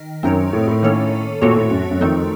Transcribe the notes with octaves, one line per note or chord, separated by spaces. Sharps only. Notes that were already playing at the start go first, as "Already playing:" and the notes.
Already playing: D#3 A#4
F#2 C4 D#4 A#4 C#5
A2
A2
D#3 A#3 C#4 A4 C#5
A#2 A3 C4 F#4 A4 C#5
A2
F#2
F#2
F2 D#3 A3 C4 D#4 A4